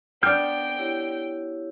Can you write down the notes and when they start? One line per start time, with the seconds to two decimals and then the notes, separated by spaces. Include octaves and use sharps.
0.23 B3 D4 G5 F6 G6
0.79 E4 G4 C#5